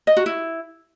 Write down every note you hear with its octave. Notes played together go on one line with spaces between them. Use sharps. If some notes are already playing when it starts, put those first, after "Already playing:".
D#5
F#4
E4